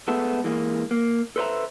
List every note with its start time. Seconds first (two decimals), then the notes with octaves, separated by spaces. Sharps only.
0.08 G#3 A3 B3 A4
0.44 E3 G#3 A#3
0.91 A#3
1.36 A4 B4 C5 D5 E5 A#5